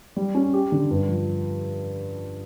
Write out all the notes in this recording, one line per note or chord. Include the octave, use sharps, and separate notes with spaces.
G3
C#4
G4
D3
G2
F3